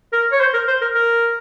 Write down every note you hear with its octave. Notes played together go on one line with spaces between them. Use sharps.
A#4
C#5
C5
A#4
C5
A#4
A#4